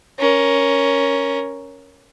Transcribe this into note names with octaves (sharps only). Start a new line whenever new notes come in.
C#4 A#4